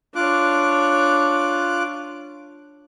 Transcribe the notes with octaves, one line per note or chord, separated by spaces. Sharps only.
D4 F4 C#5 D6 F#6